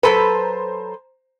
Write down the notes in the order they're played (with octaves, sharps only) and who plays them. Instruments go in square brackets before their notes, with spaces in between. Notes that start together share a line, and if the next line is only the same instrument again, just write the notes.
[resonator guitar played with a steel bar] F#3 A4 B4 [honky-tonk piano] C5 A#5